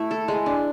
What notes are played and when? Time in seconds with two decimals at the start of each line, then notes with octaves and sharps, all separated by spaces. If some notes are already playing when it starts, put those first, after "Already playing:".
Already playing: A3 E4
0.11 A4
0.28 G#3
0.46 D4